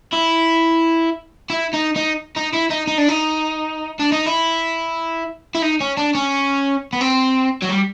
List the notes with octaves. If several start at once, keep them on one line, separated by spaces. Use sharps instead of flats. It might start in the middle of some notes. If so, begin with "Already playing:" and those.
E4
E4
D#4
D#4
D#4
E4
D#4
D#4
D4
D#4
D4
D#4
E4
E4
D#4
C#4
D4
C#4
B3
C4
F#3
G3